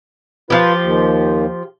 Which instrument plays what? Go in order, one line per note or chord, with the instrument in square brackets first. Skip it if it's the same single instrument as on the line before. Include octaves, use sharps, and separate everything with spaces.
[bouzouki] F3 G4 [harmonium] F4 B4
[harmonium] D#2